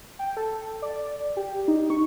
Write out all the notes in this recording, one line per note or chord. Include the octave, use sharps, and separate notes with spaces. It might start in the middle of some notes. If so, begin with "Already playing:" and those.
G5
A4
D5
G4
D#4
C#6